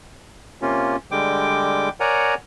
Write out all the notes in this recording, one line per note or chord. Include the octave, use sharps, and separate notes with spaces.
C3 A#3 C#4 F4
D3 G3 G#3 G5 D6
A#4 C#5 D5 F#5 G#5 A#5